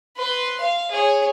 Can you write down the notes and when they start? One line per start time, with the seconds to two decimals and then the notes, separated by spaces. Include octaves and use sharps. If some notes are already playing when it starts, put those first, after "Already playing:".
0.16 B4 C6
0.60 F5
0.91 G#4 C#5